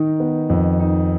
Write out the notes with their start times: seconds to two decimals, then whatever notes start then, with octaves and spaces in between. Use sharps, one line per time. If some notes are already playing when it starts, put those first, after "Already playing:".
Already playing: D#3 D#4
0.20 B3
0.49 F2
0.80 D#4